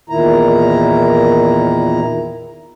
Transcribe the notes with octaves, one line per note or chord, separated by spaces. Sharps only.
E2 A#2 D#3 E4 A#5